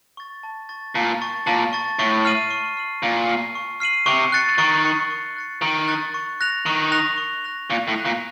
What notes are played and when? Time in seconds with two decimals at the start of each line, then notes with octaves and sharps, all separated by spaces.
0.17 C#6 A6
0.43 A5
0.69 C#6 A6
0.95 A#2 A5
1.22 C#6 A6
1.47 A#2 A5
1.73 C#6 A6
1.99 A2 C#6
2.25 F6 C7 D#7 F#7
2.50 C#6
2.77 F6 C7 D#7 F#7
3.03 A#2 C#6
3.29 F6 C7 D#7 F#7
3.55 C#6
3.80 F6 C7 D#7 F#7
4.06 C3 C#6
4.32 F#6 A6 C#7
4.58 D#3 C#6
4.85 F#6 A6 C#7
5.11 C#6
5.36 F#6 A6 C#7
5.62 D#3 C#6
5.88 F#6 A6 C#7
6.14 C#6
6.41 F#6 A#6 F7
6.66 D#3 C#6
6.92 F#6 A#6 F7
7.18 C#6
7.44 F#6 A#6 F7
7.69 A#2 C#6
7.88 A2
7.96 F#6 A#6 F7
8.05 A#2